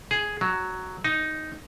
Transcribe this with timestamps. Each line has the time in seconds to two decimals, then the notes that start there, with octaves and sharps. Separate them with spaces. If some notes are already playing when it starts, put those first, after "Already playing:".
0.11 G#4
0.41 F#3
1.04 D#4